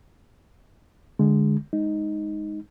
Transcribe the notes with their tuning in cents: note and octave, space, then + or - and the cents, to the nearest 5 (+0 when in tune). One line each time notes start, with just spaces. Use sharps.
D3 +5 G#3 +0
G#3 +0 D#4 +0